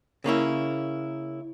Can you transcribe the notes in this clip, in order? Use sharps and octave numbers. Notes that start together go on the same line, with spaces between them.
C#3 A#3 C#4 E4